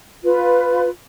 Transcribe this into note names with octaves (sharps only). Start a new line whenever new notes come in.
F4 B4